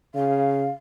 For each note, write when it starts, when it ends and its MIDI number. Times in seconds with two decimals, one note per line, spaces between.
0.15 0.69 49
0.15 0.71 77